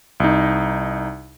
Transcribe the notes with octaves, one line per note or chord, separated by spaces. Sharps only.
C2 D#4